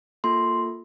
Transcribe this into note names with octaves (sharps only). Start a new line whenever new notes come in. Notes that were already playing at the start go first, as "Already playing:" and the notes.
A#3 F4 A4 C6